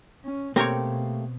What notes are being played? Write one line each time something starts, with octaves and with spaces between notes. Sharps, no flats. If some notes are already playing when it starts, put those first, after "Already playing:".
C#4
B2 A3 A#3 C4 G4 A#4 C#5